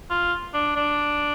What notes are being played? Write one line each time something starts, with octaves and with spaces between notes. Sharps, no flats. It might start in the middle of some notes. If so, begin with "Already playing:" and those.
F4
D4
D4